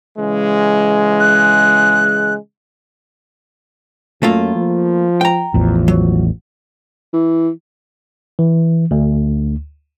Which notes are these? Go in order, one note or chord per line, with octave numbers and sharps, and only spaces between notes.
C#3 E3 G#3
F#6
F#2 A3 A#3 F4
F3
G5 A#5
A1 E2 F3
F#3
E3
E3
D2